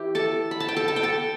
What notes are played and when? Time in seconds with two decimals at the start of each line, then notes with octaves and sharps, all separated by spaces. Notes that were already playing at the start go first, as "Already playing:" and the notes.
Already playing: E3 E4 G4
0.15 A4 A5
0.51 B5
0.60 A5
0.68 G5
0.76 A4 A5
0.88 A5
0.96 G5
1.03 A4 A5